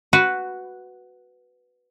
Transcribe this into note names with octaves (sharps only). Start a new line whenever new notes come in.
F#4 B4